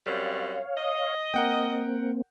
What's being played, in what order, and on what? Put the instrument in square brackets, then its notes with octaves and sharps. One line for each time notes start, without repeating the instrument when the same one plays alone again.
[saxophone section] F#2 G3 C4 [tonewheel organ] C#5 F5
[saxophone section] D#5
[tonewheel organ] A#3 C4 [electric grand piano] A#4 F#5 G5